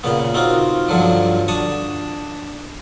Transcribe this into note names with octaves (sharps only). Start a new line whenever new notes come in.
A#2 C#3 B3
C4 D#4 F4 F#4
G2 D3 F3 F#3
D4 A5 C#6 D#6